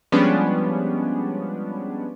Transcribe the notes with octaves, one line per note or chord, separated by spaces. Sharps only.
F3 G3 G#3 B3 C#4 D4